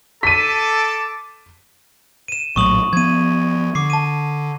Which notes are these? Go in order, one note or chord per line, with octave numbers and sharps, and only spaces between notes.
A4 A5 D6 B6 D#7
D#7 E7
A#1 A2 F#3 C#6 D#6 F#7
F3 B3 G#6 D#7
D3 D6 C7
A5 D#7